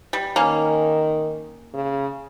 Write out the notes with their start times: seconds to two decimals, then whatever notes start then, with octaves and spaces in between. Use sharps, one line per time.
0.13 G3
0.36 D#3 A#3 C#4
1.74 C#3